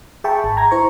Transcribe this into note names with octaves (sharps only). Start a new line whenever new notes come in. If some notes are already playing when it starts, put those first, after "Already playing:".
G#4 E5 G5 A5 B5 C#6
G#1
A#5 G#6 A#6
E4 C5 C#6